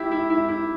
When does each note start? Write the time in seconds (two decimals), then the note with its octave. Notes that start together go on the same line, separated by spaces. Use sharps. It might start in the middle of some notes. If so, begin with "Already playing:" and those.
Already playing: E4 G4
0.11 E4
0.30 E4
0.49 E4